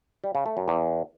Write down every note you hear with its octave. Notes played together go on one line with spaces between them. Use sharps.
G3
C#3
A3
F#2
E2